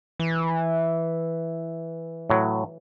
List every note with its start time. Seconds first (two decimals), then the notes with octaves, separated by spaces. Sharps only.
0.20 E3
2.30 A2 F#3